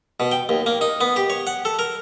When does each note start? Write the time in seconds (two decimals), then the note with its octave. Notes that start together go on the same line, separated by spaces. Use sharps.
0.20 B2
0.32 G5
0.49 D#2
0.66 A#3
0.81 D#4
1.01 B3
1.16 G4
1.30 C#5
1.47 F#5
1.65 A4
1.79 A#4